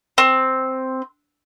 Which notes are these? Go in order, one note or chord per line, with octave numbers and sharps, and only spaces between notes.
C4